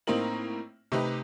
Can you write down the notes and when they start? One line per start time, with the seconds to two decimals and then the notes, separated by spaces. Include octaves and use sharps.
0.07 A2 A#3 C4 D#4 A#4 F#7
0.92 C3 A3 D#4 G4 B4